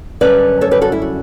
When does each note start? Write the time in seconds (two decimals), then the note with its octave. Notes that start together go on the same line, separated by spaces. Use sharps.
0.21 F#2 D3 G3 C#4 B4 D5
0.61 A4 C#5
0.71 G4 B4
0.81 F#4 A4
0.92 E4
1.02 F#4